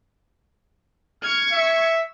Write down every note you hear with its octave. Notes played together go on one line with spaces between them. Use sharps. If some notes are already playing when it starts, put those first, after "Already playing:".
C#6 F6 G#6
E5